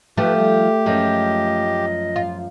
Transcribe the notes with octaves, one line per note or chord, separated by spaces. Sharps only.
F3 A3 G4 B4
G3
F#2 F3 G#3 D#5
F4